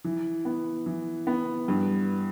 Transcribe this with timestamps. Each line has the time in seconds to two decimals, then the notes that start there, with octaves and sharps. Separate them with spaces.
0.04 E3
0.45 B3
0.86 E3
1.27 B3
1.68 G2